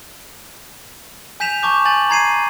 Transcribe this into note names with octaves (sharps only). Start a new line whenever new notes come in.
G#5 G6 B6 E7 F7
A5 C#6 D6 G6
G#5 G6 A6 F#7
A#5 G#6 C7 D#7